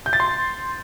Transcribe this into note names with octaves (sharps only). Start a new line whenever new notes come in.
G6
A6
C6